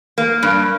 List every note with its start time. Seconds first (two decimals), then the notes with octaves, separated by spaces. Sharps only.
0.18 A#3
0.43 G2